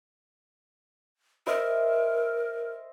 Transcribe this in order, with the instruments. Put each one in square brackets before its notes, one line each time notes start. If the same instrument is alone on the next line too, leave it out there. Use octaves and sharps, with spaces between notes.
[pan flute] A#4 [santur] C5 D#5 E5